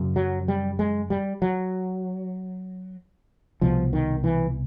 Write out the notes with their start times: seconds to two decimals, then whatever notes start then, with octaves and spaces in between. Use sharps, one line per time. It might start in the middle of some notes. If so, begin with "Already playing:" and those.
Already playing: F#2 C#3
0.16 F#3
0.48 G3
0.79 G#3
1.10 G3
1.42 F#3
3.61 C2 B2 F3
3.93 D#3
4.24 E3